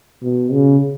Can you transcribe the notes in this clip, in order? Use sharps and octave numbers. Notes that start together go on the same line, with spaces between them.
B2
C#3